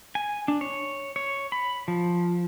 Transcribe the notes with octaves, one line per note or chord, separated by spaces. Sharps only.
G#5
D4
C#5
C#5
B5
F3